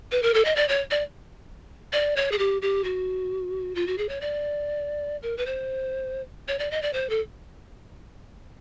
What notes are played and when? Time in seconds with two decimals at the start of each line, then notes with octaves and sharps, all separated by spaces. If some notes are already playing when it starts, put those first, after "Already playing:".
0.11 B4
0.22 A#4
0.34 A4
0.45 D#5
0.56 D5
0.68 C#5
0.91 D5
1.92 D5
2.16 C#5
2.32 G#4
2.38 G4
2.62 G4
2.84 F#4
3.75 F4
3.87 F#4
3.98 G#4
4.09 C#5
4.21 D5
5.23 A#4
5.37 B4
5.46 C5
6.48 C#5
6.59 D5
6.71 D#5
6.82 D5
6.93 C5
7.09 A4